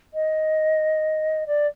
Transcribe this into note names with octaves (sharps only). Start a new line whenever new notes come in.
D#5
D5